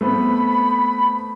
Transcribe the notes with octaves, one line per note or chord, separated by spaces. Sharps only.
A3 B3 C4 B5